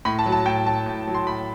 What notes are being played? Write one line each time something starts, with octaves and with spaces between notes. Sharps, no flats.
A2 B5
A5
F#3
A5
A2 G5
F#3 A5
A2
F#3
C6
A2 B5